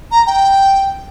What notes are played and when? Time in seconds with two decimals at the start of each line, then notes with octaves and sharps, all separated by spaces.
0.12 A#5
0.27 G5